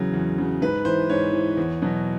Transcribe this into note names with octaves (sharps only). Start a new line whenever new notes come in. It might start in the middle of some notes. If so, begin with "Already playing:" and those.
Already playing: E2 C#3 F#3
E2
C#3 F#3
G#2 B4
E3 C5
G#2 C#5
E3
E2
B2 F#3